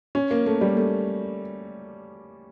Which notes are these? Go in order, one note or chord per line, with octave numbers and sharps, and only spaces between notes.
C#4
A#3
A3
G3
A3